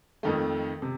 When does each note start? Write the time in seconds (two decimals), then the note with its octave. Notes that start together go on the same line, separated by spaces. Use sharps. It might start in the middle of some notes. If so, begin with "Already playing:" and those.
0.23 F2 D#3 A3
0.82 C3